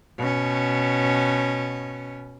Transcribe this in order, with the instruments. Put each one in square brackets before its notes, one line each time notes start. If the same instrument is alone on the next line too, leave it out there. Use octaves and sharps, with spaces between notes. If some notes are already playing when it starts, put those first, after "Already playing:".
[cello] B2 C#4